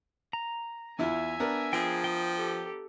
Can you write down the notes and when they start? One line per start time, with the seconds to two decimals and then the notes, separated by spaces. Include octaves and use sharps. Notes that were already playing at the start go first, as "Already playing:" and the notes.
0.33 A#5
0.99 E2 E4 F4 E5 G#5
1.40 B3 D4 A#4
1.73 F3 G#4 G5
2.04 G5 D#6
2.37 G4 A4